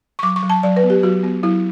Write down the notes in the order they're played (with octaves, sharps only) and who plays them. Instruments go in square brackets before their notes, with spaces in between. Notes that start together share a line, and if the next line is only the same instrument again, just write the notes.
[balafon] C#6
F#3 D6
C#6
F#3
A5
F#3 D5
B4
B3
G4
F#3 F#4
B3
F#3 E4